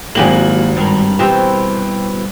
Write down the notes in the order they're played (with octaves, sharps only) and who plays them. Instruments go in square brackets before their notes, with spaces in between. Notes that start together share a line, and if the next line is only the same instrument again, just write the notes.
[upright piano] G#1 F#7 [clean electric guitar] F#3 E4 [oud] A#3 G4 G#4
[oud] G2 [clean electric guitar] G3 A#4
[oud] B2 E3 C4 [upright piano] G4